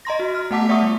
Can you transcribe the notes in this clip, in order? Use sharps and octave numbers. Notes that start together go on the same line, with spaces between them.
D#5 A#5 C6 A#6
F#4
F6
A3 B3 F#5 A5 D6 B6
D5 E5 F#5 C#6 D#6
G3